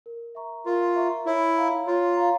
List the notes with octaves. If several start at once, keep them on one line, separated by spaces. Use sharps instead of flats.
A#4
E5 A#5 C#6
F4 A#4
E5 A#5 C#6
E4 C#5
F5 A#5
F4 C#5
F5 A#5